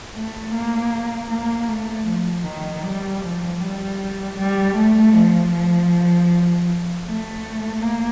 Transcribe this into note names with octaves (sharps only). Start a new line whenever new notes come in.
A3
A#3
A#3
A3
F3
D#3
G3
F3
G3
G3
A3
F3
F3
A3
A#3